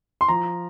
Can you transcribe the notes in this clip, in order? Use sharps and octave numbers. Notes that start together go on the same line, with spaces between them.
C6
F3 A#5